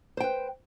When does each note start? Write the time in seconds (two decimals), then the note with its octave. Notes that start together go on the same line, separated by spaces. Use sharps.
0.17 C5
0.20 G5
0.24 B4